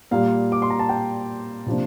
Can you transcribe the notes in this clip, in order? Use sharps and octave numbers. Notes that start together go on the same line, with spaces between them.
A#2 G3 A#3 F5
D6
C6
A#5
A5
G5
C3 F3 A#3 D4